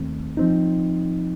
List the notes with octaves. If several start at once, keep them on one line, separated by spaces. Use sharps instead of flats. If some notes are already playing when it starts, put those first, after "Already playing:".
Already playing: D#2 D#3 A3 C4
F3 C4 D#4